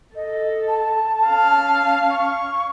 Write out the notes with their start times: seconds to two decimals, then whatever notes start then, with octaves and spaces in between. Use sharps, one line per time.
0.15 A4 D#5
0.67 A5
1.26 C#4 F5
2.10 C#6